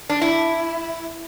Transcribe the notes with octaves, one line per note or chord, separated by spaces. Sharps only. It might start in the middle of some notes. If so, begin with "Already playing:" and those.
D4
E4